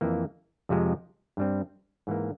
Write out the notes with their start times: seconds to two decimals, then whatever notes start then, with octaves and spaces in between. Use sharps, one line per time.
0.01 F2 E3 A#3
0.69 F2 C3 F3 G#3
1.37 G2 G3 C4
2.07 G#2 E3 A#3